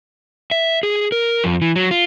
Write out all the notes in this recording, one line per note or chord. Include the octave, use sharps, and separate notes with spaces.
E5
G#4
A#4
F2
E3
F#3
F4